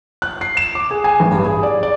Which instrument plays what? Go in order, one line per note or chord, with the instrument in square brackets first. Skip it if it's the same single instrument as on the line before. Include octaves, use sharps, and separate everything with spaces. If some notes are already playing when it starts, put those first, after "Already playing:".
[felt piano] F#6
C7
E7
D6
G#4
G#5
A1
G2
G#4
D5
D5